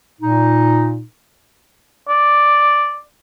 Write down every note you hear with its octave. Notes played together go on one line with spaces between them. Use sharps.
A#2 D#4
D5